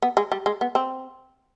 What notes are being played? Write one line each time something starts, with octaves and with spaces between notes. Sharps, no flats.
B3
G#3
G3
G#3
B3
C4